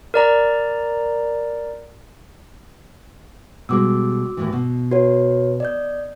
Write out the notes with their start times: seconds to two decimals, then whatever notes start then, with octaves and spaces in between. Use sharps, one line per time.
0.14 A#4 D5 A#5
3.69 B2 G3 G#3 F#4 D6 E6
4.37 D#2 A2 E3
4.53 B2
4.91 F#4 B4 C#5
5.60 D5 D#5 G6